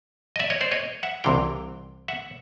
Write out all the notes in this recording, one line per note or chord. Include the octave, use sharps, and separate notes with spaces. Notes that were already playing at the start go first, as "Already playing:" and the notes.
D#5
D5 E5
C#5 D#5
C5 D5
C#5 D#5
E5 F#5
C2 C3 E3 F5 G5
E5 F#5